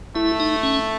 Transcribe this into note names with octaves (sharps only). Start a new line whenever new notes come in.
A3 E4
D#4
C#4